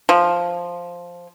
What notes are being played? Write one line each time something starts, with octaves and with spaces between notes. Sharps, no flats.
F3